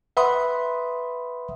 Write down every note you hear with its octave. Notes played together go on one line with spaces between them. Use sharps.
B4 E5 F#5 B5 C6 D#6